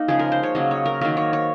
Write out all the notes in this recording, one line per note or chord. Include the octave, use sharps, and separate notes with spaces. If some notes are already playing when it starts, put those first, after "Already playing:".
Already playing: A#3 D#4
C#3 F3 G#3 G#4
A#4
C5
C#5
C#3 F#3 A#3 D#5
C#5
A#4
D#3 F#3 A#3 A#4
C#5
C#5